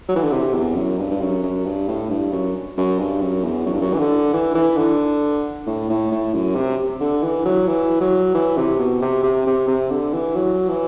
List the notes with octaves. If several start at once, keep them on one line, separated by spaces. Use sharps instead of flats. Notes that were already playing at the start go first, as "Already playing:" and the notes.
F#3
E3
D3
C3
E2
F#2
G2
G2
F#2
F#2
G2
A2
G2
F#2
F#2
G2
F#2
E2
F#2
G2
F#2
E3
D3
E3
E3
D3
A2
A2
A2
F#2
C3
D3
E3
F#3
E3
F#3
E3
C3
B2
C3
C3
C3
C3
D3
E3
F#3
E3